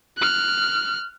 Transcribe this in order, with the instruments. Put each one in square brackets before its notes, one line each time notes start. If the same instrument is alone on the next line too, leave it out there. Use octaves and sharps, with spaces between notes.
[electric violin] F6 F#6